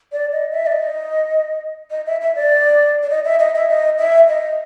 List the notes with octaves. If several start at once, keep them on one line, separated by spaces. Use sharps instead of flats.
D5
D#5
E5
D5
D#5
D#5
E5
E5
D5
D5
D#5
E5
D#5
E5
D#5
E5
D#5